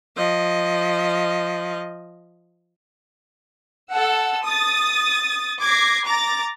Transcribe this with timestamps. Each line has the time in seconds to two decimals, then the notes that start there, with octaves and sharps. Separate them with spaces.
0.17 F3 D#5
3.92 A4 F#5 E6
4.44 D#6 A6
5.62 D6 G#6 A#6 C7
6.06 A#5 D6 A6